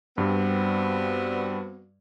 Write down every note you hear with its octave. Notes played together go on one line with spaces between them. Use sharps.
G2 G3 B3 C4 F#4